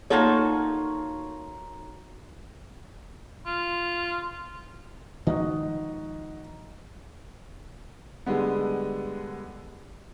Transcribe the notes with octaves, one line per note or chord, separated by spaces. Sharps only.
A#3 D#4 F4 F#4 A4 C#5
F4
D#3 F3 G#3 D#4 F#4 D#5
D3 G3 G#3 B3